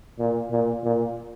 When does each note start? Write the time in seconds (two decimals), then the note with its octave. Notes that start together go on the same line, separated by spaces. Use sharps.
0.19 A#2
0.51 A#2
0.84 A#2